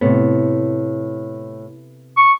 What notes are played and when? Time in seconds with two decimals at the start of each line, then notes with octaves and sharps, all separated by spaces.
0.01 A2 C3 B3
2.17 C#6